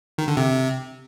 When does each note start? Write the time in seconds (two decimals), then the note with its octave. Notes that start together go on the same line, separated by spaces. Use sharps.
0.18 D#3
0.28 D3
0.37 C3